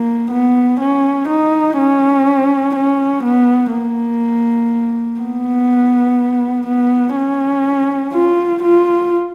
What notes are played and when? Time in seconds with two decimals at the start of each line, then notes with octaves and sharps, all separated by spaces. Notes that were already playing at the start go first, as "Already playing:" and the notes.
Already playing: A#3
0.31 B3
0.80 C#4
1.28 D#4
1.78 C#4
2.75 C#4
3.24 B3
3.73 A#3
5.20 B3
6.66 B3
7.16 C#4
8.13 F4
8.63 F4